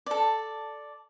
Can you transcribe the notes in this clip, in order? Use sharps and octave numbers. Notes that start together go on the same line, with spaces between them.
A4 D5